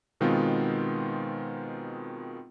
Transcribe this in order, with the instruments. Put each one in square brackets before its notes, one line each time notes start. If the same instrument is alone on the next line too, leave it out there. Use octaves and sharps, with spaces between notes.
[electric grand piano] B2 D#3 G#3 B3 C4 F4